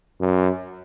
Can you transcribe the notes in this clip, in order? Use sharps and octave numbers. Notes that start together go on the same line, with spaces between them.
F#2